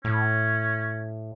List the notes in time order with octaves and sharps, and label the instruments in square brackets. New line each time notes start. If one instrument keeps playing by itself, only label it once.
[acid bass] A2 [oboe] C#4